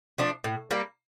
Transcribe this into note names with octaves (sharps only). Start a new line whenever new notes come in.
F3 A3 D4
A2
G3 A#3